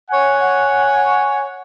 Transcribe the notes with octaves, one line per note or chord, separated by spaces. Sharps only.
C#5 F#5 G#5